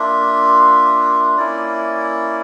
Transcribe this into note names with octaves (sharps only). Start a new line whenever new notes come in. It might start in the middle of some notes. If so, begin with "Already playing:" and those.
Already playing: A#3 D4 F4 E5
A#3 C#4 E4 D5